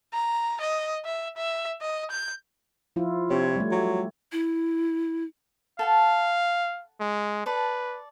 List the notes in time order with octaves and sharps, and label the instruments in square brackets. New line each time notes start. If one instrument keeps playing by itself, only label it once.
[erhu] A#5
D#5
E5
E5
D#5
G6
[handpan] F3 E4 F4
[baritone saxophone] C3 [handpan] D4 C#5
[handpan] G3 A3
[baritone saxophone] F#3
[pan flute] E4
[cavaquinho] A4 F#5 A5 [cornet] F5
[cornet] G#3
[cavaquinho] A4 D5 [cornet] B4